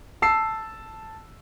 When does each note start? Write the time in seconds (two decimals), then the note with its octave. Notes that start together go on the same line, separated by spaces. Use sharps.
0.22 A5 E6 C7